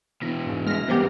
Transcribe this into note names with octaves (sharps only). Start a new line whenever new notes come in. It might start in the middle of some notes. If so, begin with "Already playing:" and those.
B2 E3 A#6
G#2 G#3
G#3 E5 F6 A#6
E2 G2 B3 C4 G4 A#4 F#5 G5